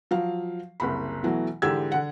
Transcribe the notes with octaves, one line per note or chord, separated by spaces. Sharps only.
F3 F#3 F5
F#1 C2 B5
B2 E3 F#3 A3
G#2 D3 E3 G4 E6 G#6
D3 F#5